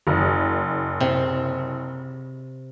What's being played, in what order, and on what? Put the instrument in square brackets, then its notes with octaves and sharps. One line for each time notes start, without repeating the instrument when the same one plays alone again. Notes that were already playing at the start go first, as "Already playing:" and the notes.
[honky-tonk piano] F#1
[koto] C3